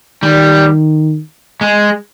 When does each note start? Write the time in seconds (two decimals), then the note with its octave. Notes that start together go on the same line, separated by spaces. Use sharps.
0.23 D#3 G3
1.61 G#3